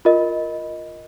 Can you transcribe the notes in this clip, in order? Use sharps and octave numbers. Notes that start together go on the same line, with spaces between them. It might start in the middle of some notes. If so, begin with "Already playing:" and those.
F4 A#4 D#5